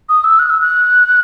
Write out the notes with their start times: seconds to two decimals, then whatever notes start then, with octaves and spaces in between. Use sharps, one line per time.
0.09 D#6
0.24 E6
0.39 F#6
0.50 E6
0.61 F#6